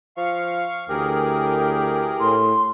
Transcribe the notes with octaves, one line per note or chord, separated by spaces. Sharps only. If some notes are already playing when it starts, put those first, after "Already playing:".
F3 F5 C#6
D2 E3 G4 G#4 A#4
A2 C6